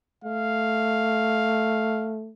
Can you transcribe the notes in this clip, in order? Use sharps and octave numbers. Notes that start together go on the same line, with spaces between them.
A3 F5